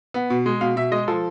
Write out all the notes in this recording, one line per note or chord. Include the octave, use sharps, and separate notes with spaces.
B3
B2
G#3
B2 F5
B2 E5
G#3 D#5
F3 A4